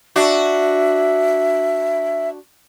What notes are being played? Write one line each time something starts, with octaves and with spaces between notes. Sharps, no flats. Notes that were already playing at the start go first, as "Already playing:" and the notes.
D4 F#4 E5